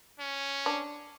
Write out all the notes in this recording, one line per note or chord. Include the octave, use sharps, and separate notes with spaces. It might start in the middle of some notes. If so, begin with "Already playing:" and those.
C#4
D4